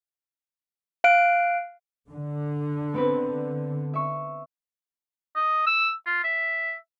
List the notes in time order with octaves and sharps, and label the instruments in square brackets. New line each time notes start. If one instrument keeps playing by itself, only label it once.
[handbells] F5 F#6 D7
[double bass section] D3
[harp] B3 C4 B4
E5 C#6
[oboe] D#5
E6
F4
E5